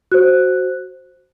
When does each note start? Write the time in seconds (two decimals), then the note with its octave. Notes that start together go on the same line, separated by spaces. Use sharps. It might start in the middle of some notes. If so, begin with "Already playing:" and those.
0.12 F#4 C5 F#6